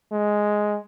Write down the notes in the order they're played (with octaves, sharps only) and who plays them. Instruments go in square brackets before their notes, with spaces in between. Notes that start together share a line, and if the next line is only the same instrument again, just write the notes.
[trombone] G#3